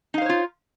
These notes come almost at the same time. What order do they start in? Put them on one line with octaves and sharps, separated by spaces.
D#4 F5 C5 C#5 F4